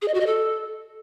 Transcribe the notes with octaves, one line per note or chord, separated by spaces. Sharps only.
G#4
D#5
F#4
D#5
A4